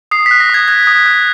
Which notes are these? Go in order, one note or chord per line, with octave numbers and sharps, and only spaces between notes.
D#6 C7
B6
F#6
A#6
D#6 G#6
F#6 G#6
D#6
F#6